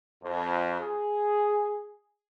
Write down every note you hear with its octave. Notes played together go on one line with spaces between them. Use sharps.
F2
G#4